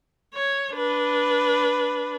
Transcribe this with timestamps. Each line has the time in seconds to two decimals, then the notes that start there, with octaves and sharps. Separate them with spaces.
0.34 C#5
0.74 D4 B4